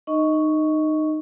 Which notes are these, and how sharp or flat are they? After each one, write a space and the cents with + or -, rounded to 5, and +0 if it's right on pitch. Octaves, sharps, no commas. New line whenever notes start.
D#4 -20 D#5 +15 C#6 +5